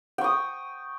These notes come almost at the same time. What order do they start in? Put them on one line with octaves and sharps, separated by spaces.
G5 C#6 D#6